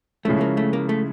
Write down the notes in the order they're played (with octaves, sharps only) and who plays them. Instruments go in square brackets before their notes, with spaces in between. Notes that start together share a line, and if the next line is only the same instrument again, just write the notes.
[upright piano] C#3 F3 G#3 C#4 E4 [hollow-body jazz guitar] A3
[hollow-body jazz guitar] A#3
A3
A#3
A3